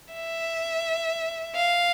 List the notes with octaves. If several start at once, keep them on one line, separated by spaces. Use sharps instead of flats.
E5
F5